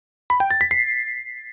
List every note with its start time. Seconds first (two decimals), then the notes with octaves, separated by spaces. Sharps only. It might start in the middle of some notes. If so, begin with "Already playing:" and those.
0.30 B5
0.40 G5
0.51 A6
0.61 B6
0.71 C7